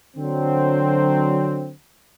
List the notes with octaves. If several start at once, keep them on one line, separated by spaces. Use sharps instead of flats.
D3 F#3 C4